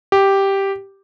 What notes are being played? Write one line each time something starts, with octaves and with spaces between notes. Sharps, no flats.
G4